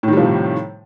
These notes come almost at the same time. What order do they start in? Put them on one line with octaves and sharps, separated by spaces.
A2 D#3 G3 F3 C3